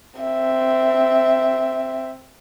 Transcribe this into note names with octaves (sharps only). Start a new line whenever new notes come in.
C4 E5